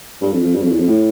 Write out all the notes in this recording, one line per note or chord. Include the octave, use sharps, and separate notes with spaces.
G2
F2
F2
G2
F2
E2
F2
A2